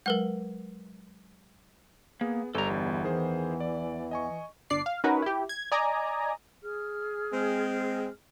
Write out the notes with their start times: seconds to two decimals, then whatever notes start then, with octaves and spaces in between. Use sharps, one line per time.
0.06 F#3 G#3 A#4 B4 F#5
2.21 A#3 B3 G#4
2.55 G1 G3 A4 A#5
2.68 E2
3.04 D#3 E3 G#4 C5
3.60 D5
4.11 D#5 G#5 C#6
4.70 G1 D4 D5 C7
4.86 F5
5.04 C#4 D#4 F#4 A#4 B4
5.22 E4 G4
5.49 G#6
5.72 D5 D#5 G#5 A#5
6.62 G#4 F6
7.32 G#3 C4